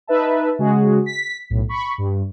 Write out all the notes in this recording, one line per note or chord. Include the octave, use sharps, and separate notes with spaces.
D#4 B4 E5 A5
C#3 G#3 F#4 G#4
B6
B1 A2
B5 C#6
G2